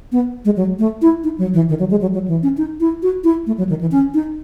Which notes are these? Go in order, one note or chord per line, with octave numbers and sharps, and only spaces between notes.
B3
G#3
F#3
A3
E4
D#4
F#3
E3
D#3
F#3
G#3
F#3
F#3
E3
C#4
D#4
E4
F#4
E4
A3
F#3
D#3
E3
C#4
D#4